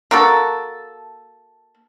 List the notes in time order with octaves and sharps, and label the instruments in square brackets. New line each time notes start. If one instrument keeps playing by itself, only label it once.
[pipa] A#3 F#4 A4